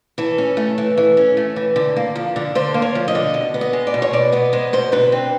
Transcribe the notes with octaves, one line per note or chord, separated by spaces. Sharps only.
E3 A4
C#4
A3
E3
E3
C#4
A3
E3
D3
A#3
F3
D3
D3 C5
A#3
C#5
F3
D#5
D3
B2
B3
D#5
G#3
D5
B2
C#5
B2 D5
B3 D#5
G#3 C5
B2 C5
D3 B4
C4